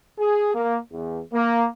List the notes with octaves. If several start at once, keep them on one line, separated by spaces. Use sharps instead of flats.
G#4
A#3
E2
A#3